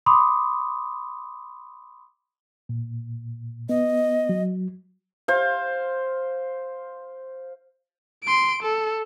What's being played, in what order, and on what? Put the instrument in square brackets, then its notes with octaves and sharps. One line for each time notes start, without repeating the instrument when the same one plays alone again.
[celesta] B5 C6 D6 D#6
[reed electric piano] A#2
[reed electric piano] B3 [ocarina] D#5
[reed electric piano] F#3
[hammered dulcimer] C5 F5
[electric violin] C6 D7
A4